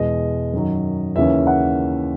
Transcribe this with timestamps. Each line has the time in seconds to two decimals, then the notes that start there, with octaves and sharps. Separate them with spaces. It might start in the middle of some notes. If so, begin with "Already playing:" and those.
Already playing: E2 B2 G#3 D#5
0.53 F#2 D#3 F#3
1.16 D#2 C#3 E3 A#3 C#4 E5
1.47 F#5